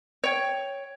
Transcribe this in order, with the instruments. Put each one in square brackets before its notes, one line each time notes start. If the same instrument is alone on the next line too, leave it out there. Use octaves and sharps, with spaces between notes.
[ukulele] C#5 G5